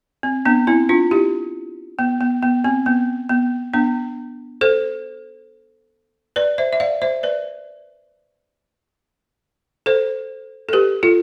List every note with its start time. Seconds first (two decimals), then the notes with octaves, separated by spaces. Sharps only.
0.23 C4
0.45 B3 D4
0.67 C4 E4
0.89 D4 F4
1.11 E4 G4
1.99 B3
2.21 B3
2.43 B3
2.64 C4
2.86 B3
3.29 B3
3.73 B3 D4
4.61 A4 C5
6.36 B4 D5
6.58 C5 E5
6.73 E5
6.80 D5 F5
7.02 C5 E5
7.23 B4 D5
9.86 A4 C5
10.69 A4
10.73 G4 B4
11.03 F4 A4